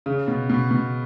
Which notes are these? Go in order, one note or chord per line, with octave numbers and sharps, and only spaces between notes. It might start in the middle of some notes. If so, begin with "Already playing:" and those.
C#3
B2
B2
B2